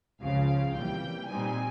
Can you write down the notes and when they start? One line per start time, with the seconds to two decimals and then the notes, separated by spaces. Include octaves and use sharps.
0.22 C#2 C#3 F3 F5
0.75 C3 E3 G3 A#3 G5
1.28 A#2 G3 C4 D#4 G#5